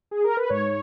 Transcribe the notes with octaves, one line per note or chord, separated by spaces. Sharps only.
G#4
A#4
B4
G#2 C#5